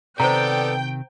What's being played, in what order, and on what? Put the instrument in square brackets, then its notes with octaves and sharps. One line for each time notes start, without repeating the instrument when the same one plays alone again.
[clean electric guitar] C3 D#3 [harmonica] B3 A4 D5 [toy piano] C5 A#5 [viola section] G5